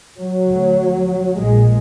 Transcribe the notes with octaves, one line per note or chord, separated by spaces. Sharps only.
F#3
D2
A#1 A#2 G#3